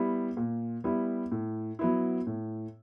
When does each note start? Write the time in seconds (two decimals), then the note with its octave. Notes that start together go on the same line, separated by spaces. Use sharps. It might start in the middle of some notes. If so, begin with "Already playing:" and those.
Already playing: G3 B3 E4
0.37 A#2
0.84 G3 B3 E4
1.31 A2
1.79 F#3 B3 E4
2.27 A2